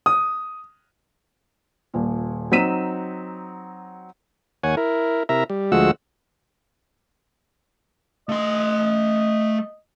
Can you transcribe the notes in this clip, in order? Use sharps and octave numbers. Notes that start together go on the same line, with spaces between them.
D#6
D#1 A#2
F#3 C4 D#4 B6 D#7 E7
D#2 C#5 F#5 G#5
E4 A#4
C3 E4 A#4 E5 A#5
G3
D2 F3 G#3 F#4 F#5 E6
A3 D#5 C6